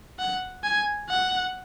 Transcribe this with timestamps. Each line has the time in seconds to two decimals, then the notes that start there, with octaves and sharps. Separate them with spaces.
0.19 F#5
0.64 G#5
1.09 F#5